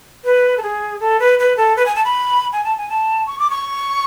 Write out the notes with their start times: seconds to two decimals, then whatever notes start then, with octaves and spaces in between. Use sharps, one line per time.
0.25 B4
0.58 A4
0.63 G#4
1.00 A4
1.20 B4
1.39 B4
1.57 A4
1.77 B4
1.86 G#5
1.96 A5
2.04 B5
2.53 G#5
2.64 A5
2.78 G#5
2.89 A5
3.27 C#6
3.39 D6
3.50 C#6